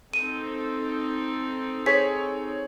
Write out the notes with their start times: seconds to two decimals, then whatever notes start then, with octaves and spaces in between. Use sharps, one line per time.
0.13 C4 D#4 A4 D#7
1.86 G#4 C5 C#5 B6